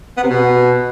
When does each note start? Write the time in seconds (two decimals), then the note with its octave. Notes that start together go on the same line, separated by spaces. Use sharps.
0.17 B3
0.23 C3
0.30 B2